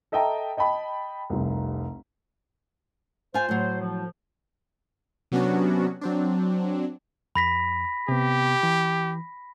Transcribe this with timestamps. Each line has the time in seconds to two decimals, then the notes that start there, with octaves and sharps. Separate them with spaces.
0.12 A4 D#5 E5 G5 A5 A#5
0.57 D#5 G5 A5 B5
1.30 F1 C2
3.34 F4 C5 G#5
3.49 A2 F#3
3.80 F3
5.32 C3 F#3 B3 C#4 D4 F#4
6.01 F#3 C4 D4
7.35 F2 B5 A#6 B6
8.09 C3 B3 G4
8.63 E3